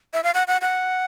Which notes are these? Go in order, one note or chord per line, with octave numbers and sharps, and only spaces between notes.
E5
F5
F#5
F#5
F#5